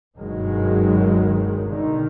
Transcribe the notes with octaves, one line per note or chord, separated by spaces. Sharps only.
F#1 B1 G2 D#3 F#3 G#3
B2 D3 D#3